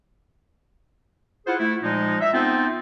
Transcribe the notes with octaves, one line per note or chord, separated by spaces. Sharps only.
E4 F4 G#4 C5 F#5
A3 E4
A#2 F3 G#3 D#4
E5
B3 C4 D#4 F4 A4 C5